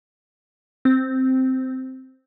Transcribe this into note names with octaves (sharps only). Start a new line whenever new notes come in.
C4